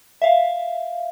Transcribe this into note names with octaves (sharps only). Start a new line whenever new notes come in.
E5 F5